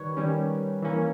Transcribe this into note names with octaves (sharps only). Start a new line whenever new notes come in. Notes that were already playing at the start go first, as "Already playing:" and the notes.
Already playing: D#3 G3 B4 C#5
D#3 G3 C#4
E3 A#3 C#4